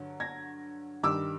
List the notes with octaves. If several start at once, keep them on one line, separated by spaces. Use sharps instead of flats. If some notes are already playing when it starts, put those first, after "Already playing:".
Already playing: G2 D3 F#3
G#6 A#6
G2 D#3 G3 D6 E6